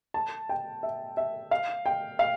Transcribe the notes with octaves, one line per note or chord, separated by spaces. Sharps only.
A5
G5
E5
E5
F5
G5
F5